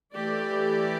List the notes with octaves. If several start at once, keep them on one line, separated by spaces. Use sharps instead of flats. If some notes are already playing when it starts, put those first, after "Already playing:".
E3 A3 G4 D5